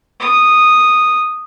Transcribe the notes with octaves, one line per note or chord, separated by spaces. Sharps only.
D#6